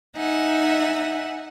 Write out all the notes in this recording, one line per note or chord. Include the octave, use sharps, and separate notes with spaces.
D#4 E5 F#5 G#5